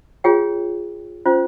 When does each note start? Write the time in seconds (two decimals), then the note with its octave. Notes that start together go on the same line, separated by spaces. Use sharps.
0.24 F4 G#4 C#5 G5
1.26 C#4 F4 C5